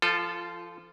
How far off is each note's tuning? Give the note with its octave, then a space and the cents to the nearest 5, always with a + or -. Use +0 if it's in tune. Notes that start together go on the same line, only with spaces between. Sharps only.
F3 -25 F4 +0 A4 +0